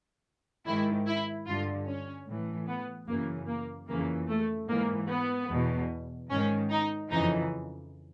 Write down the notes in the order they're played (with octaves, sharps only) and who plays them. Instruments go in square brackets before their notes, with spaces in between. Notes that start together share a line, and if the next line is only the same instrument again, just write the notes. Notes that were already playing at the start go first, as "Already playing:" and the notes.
[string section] G#2 D#3 E4
E4
G2 D3 F4
C#4
A2 E3
B3
F#2 C#3 E3 A#3
A#3
F2 C#3 E3 A#3
A3
G#2 E3 A#3
B3
E2 B2
G#2 D#3 C#4
D#4
F2 C#3 E3 D#4